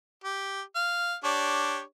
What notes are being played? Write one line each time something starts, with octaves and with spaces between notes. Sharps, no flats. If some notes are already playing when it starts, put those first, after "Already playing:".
G4
F5
D4 G4 C#5